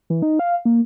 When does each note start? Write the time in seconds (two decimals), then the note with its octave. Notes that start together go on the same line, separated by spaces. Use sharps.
0.10 E3
0.22 D#4
0.39 F5
0.65 A#3